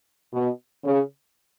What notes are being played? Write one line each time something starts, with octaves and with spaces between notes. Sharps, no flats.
B2
C#3